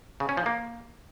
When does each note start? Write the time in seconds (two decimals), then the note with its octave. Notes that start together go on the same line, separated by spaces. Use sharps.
0.20 C#3
0.29 C#4
0.37 F3
0.46 A#3